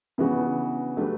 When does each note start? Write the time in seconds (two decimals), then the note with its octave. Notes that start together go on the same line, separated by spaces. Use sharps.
0.18 C#3 E3 B3 D4 F#4
0.97 F#3 A3 D4 G4 B4